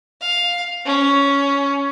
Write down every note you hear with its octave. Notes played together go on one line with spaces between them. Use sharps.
F5
C#4